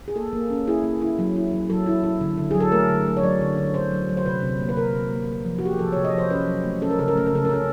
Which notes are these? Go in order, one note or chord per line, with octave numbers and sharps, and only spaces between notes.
G#4
A#3 A4
A#3
C#4
E4 G#4
A#3
E4
F#3
E4
F#3
F#3 A4
E4
E4
D3
D3
F#3 G#4
A4
A3 A#4
D3
A3
C#5
F#3 D5
D3
D3
D3 C5
F#3
F#3
C5
C3 B4
C3
A#3
B4
C3 A#4
C3
A#3
A#3
F3
F#4
A#3 G4
G#4
F3 A4
C3 C#5
D#5
F3 C5
C#4 B4
F#3
A3
C#4 A4
A#4
C#3 A4
A#4
A3 A4
A#4
C#3 A4
A#4
C#4 A4